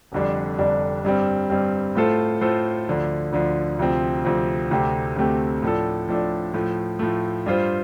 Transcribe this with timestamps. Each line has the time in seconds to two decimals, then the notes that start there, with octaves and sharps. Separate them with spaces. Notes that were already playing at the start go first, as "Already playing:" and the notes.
0.12 F1 F2 D3 G3 D4
0.58 F1 F2 D3 G3 D4
1.05 G2 G3 C4
1.50 G2 G3 C4
1.95 A2 A3 F4 A4 C5
2.41 A2 A3 F4 A4 C5
2.88 D2 D3 F3
3.33 D2 D3 F3
3.79 D2 C3 F3 C4
4.25 D2 C3 F3 C4
4.71 D2 C3 A3 C4 G4
5.16 D2 C3 A3 C4 G4
5.63 A2 F3 D4 A4
6.08 A2 F3 D4 A4
6.53 A2 F3 A3
6.99 A2 F3 A3
7.46 G2 G3 F4 C5